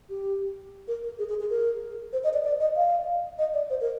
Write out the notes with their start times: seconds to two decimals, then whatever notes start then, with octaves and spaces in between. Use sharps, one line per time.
0.09 G4
0.88 A#4
1.03 A#4
1.19 G#4
1.29 G#4
1.40 G#4
1.50 A#4
2.13 C5
2.24 D#5
2.33 D5
2.44 D5
2.60 D#5
2.76 F5
3.39 D#5
3.54 D5
3.70 C5
3.81 A#4